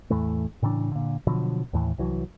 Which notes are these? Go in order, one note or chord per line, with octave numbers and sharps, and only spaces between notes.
E2 A2 E3 A3
A2 C#3 E3 D4
A#2 D3
B2 D3 F3 F#3
D#2 A2 E3
C2 E3 F#3